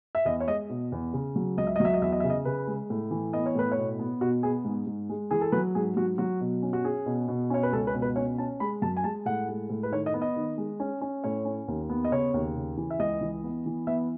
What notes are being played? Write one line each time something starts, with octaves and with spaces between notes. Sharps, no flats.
E5
E2 D#5
C#5
G#3 D#5
B2
E2
C#3
F#3
C#2 D#5
E5
D#5
F#3 E5
D#5
E2 E5
D#5
C#3 E5
D#5
C#3 B4
G#3
A2
E3
B3 D#5
C#5
A2 B4
C#5
B2
B3
B2 F#4
B3 G#4
G#2
G#2
G#3
E3 G#4
A4
F#3 B4
G#2 G#4
F#3 F#4
F#3 F#4
B2
C#4
F#4
C#4 G#4
B2
B2
C#4 C#5
B4
C#2 A4
B4
B2
B4
C#4 C#5
C#4 A5
G#3 B5
F#2 A5
G#5
G#3 A5
A2 F#5
G#3
A2
B4
D#3 C#5
D#5
B3
D#5
D#3
G#3
C#4
C#4
A2 C#5
C#4
D#2
B3
D#5
C#3 C#5
D#2
C#3
E3
E5
C#2 D#5
E3
B3
E3
B3 E5